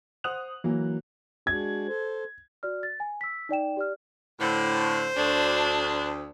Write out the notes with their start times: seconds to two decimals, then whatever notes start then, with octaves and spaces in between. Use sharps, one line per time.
0.24 C5 F#5 D#6 F#6 F7
0.64 E3 F#3 A#3
1.47 G#3 D4 F#4 G#6
1.88 A4 C5
2.63 F#4 D5 F6
2.83 A6
3.00 G#5
3.21 E6 B6
3.49 D#4 D5 G5 E7
3.77 G4 D5 F6
4.40 A2 D3 C5
5.17 D2 D4